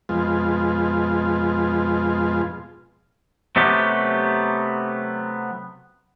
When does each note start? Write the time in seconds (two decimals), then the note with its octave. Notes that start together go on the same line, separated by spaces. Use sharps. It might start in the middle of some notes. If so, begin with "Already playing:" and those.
0.09 F2 B2 G#3 F4
3.56 C3 F#3 A3 B3 G4